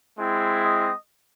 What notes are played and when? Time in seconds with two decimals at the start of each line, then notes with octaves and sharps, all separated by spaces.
0.16 G#3 C4 E4
0.63 D#5